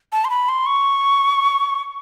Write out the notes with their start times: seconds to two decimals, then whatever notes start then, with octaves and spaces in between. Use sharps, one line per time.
0.12 A5
0.25 C6
0.30 B5
0.49 C6
0.66 C#6